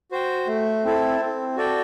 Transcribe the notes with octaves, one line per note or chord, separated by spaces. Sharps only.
F#4 C5 G5
A3
C4 E4 A4
C4
F#4 A4 D5 G5